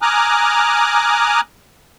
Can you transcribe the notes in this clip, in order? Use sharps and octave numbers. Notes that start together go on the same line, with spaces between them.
G#5 A#5 D6 D#6 F6 F#6